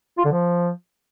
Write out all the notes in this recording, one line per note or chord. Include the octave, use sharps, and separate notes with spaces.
F4
D3
F3